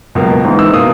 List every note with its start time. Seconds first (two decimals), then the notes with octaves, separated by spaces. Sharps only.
0.15 C#2 B2 F#3 A#3
0.44 G#1 G#2 E3
0.59 E6
0.73 B2 A#3 D#6